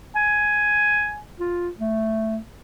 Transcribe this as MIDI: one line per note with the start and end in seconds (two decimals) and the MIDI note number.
0.16 1.15 80
1.40 1.69 65
1.80 2.37 57